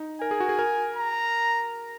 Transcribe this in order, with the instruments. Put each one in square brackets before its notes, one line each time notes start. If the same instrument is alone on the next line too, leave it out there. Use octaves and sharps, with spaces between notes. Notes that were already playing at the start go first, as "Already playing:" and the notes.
Already playing: [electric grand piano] D#4
[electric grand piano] A#4 [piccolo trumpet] G#5
[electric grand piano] G#4
F#4
G#4
A#4
[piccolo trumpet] A#5